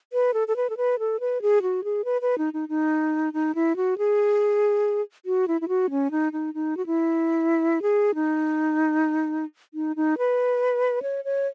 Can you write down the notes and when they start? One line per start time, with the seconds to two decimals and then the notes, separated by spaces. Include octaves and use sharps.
0.13 B4
0.34 A4
0.48 A4
0.56 B4
0.70 A4
0.77 B4
0.99 A4
1.20 B4
1.42 G#4
1.62 F#4
1.84 G#4
2.05 B4
2.22 B4
2.38 D#4
2.53 D#4
2.69 D#4
3.33 D#4
3.55 E4
3.76 F#4
3.98 G#4
5.26 F#4
5.48 E4
5.61 E4
5.68 F#4
5.91 C#4
6.11 D#4
6.33 D#4
6.54 D#4
6.77 F#4
6.86 E4
7.82 G#4
8.15 D#4
9.74 D#4
9.96 D#4
10.18 B4
11.02 C#5
11.25 C#5